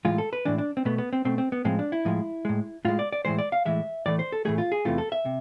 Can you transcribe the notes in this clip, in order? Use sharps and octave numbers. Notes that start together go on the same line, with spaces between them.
A2 E3 G#3 F4
A4
B4
A2 E3 G#3 D4
D4
C4
B2 A3 B3
B3
C4
B2 A3 C4
C4
B3
A2 F3 G#3 C4
D4
E4
A2 F3 G#3
A2 G#3
A2 G#3 F4
D5
D5
A2 E3 G#3 C5
D5
F5
A2 E3 G#3 E5
A2 E3 A3 D5
C5
A4
A2 E3 A3 G#4
F4
G#4
E2 C3 E3 A3 F4
A4
E5
C3